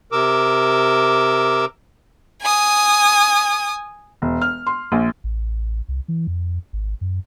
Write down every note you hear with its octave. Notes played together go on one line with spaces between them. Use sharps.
C3 A#4 D6 E6
G#5 D#6
E1
F6
C6
A#1
A1
C2
E3
F2
G#1
F#2